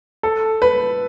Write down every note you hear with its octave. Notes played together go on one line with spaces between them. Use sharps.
A4
B4